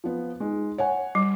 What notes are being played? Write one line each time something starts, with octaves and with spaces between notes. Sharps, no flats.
F3 B3
G#3 D#4
C#5 F#5 G#5
G3